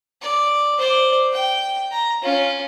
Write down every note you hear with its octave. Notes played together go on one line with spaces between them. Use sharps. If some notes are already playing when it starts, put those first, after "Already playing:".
D5
C5 D5
G5
A#5
C#4 F4